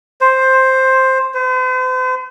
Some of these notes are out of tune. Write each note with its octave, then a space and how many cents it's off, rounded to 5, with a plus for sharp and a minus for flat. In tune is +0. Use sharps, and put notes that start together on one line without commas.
C5 +5
C5 -45